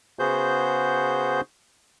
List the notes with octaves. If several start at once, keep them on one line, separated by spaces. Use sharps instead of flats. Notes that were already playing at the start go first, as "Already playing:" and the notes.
C#3 B3 F#4 G#4 C5 G6